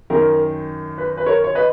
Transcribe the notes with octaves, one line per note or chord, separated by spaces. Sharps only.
F#2 D#3 A#4
B4
B4
A#4 C#5
C#5
B4 D#5